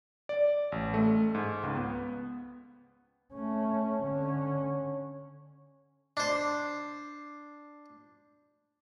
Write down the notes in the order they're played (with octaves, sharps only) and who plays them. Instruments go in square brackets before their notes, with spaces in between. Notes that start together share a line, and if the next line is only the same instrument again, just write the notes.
[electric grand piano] D5
A1
A3
G#2
C#2
B3
[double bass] A3 C#4
D3 C#4
[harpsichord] D4 C5